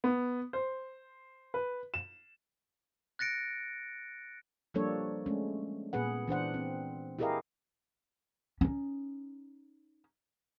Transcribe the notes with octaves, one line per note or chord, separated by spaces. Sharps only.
B3
C5
B4
E7
F#6 A6 A#6 C#7 D7
F3 G3 A#3 D4 A4 C#5
G#3 A3 C#4
A#2 B3 G#4 B4 F#5
E3 D4 C5 F#5
C4
E4 G4 G#4 A#4 D#5 F5
C#4 D#4